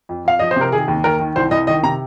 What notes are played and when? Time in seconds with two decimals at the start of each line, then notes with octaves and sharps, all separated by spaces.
0.09 F2
0.25 F2 F5
0.39 F3 D#5
0.51 C5
0.56 C3 A#4
0.72 D#3 G#4
0.88 D#2
1.04 D#2 A#4
1.20 D#3
1.36 C2 C5
1.51 C2 D#5
1.67 D#3 D#5
1.83 C3 A#5